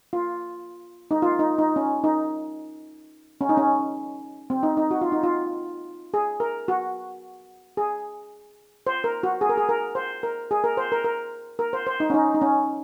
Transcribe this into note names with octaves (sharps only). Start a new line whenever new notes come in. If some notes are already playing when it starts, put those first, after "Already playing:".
F4
D#4
F4
D#4
D#4
C#4
D#4
C#4
D#4
C#4
C4
D#4
D#4
F#4
F4
D#4
F4
G#4
A#4
F#4
G#4
C5
A#4
F#4
G#4
A#4
G#4
A#4
C5
A#4
G#4
A#4
C5
A#4
A#4
A#4
C5
C5
D#4
C#4
D#4
D#4
C#4